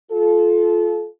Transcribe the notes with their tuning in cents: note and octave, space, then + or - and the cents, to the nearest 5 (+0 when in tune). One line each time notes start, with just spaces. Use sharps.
F4 +0 A4 -30